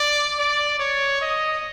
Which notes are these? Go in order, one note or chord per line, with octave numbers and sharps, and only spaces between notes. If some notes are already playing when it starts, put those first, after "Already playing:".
Already playing: D5
D5
C#5
D#5